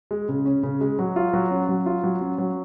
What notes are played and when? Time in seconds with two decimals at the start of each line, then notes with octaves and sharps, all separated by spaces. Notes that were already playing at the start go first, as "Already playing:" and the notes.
0.11 G#3
0.29 C#3
0.46 C#4
0.63 C#3
0.81 G#3
0.99 F#3
1.16 F4
1.33 F#3
1.51 C#4
1.69 F#3
1.86 F4
2.04 F#3
2.21 C#4
2.38 F#3